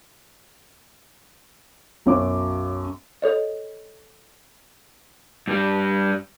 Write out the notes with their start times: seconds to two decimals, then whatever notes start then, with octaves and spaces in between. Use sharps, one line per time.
2.06 B1 F#2 C#5 D6
3.22 A4 C#5 D#5
5.47 G2 G3